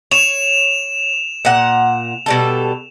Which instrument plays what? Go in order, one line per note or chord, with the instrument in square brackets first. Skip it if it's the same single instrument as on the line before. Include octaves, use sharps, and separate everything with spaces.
[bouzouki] C#5 [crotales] E7 F7
[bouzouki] A#2 F#5
B2 G3 A4